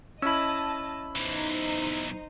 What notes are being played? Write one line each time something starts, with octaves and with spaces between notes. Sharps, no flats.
C#4 E4 D#5 A5 B5 E6
B1 E3 D#4 C5